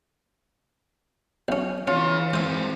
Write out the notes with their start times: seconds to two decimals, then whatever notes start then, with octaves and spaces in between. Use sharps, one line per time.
1.48 B1 C#4
1.88 E3 C#4 F4 G#4 C#5
2.34 G#3 C4 C5 E5